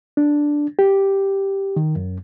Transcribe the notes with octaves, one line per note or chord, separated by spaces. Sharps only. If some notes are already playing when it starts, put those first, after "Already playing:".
D4
G4
D#3
F#2